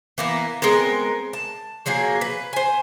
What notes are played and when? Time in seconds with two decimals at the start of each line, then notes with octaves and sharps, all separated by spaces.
0.18 E3 A#3 B3
0.62 G#3 B3 C4 A#4
1.33 A5
1.86 F3 F#3 A#3 G#4
2.21 B4
2.53 C5 G#5